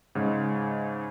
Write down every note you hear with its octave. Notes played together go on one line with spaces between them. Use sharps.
G#2 C#3 G#3